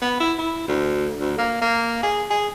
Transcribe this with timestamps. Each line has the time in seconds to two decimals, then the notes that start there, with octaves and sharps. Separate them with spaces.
0.02 B3
0.20 E4
0.38 E4
0.68 D2
1.20 D2
1.38 A#3
1.61 A#3
2.03 G#4
2.30 G#4